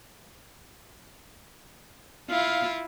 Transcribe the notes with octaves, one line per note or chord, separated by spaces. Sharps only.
E4 F4 F5